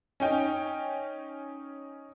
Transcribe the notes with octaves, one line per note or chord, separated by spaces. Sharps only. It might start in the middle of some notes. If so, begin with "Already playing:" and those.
C#4 D#4 G5